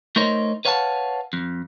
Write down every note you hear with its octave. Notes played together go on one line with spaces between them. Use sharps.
A3 D#4 A#4 C5 C#5 D#5
B4 C#5 F5 F#5 G#5 A5
F2